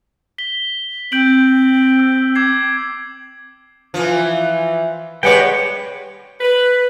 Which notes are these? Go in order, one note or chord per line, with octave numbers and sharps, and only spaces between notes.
B6 G7
C4 G6 D7 F#7
E6
D6 G#6 C7
E3 F3
G3 G#3 B4 C#5 F#5 G5
B4